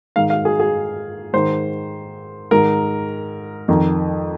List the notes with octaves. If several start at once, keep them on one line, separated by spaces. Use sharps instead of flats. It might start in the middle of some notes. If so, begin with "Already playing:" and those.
G#2 D#3 F5
F5
G#4
G#4
G#2 D#3 C5
G#2 D#3 A#4
F2 D#3